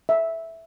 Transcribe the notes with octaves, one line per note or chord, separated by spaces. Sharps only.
E5